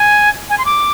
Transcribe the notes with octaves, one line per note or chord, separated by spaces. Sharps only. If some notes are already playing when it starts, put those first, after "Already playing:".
Already playing: G#5
G#5
C6
D6